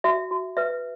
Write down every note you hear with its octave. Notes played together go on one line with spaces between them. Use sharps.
F#4 E5
F#4
B4 E5